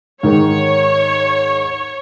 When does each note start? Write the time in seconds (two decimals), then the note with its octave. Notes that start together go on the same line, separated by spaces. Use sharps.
0.23 G#2 D#3 C#5